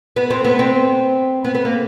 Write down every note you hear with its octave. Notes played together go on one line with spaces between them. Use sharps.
B3
C4
B3
C4
B3
B3
A#3